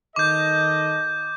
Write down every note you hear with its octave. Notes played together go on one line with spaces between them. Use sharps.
D#3 A4 D#5 D6 G6